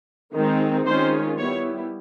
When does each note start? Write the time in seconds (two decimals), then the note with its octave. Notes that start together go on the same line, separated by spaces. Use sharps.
0.33 D#3 G#3 C4 D#4
0.86 D#3 G#3 C#4 F4 C5
1.38 G3 B3 E4 C#5